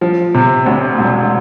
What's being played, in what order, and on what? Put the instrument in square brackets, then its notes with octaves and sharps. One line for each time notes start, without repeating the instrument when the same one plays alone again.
[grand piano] F3
C3
D2
E1